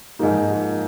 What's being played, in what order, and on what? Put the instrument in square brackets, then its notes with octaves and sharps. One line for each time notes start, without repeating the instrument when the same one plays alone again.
[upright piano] G#2 F3 A#3 D#4